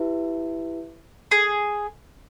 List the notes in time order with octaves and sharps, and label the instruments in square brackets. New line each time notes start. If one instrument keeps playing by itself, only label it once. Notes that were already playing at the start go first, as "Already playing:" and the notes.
Already playing: [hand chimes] E4 G4 B4 E5
[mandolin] G#4